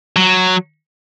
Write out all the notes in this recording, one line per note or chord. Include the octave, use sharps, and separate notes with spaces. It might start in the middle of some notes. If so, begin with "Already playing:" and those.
F#3